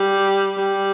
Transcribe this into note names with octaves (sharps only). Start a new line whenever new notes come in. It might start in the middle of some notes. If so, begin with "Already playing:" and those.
Already playing: G3
G3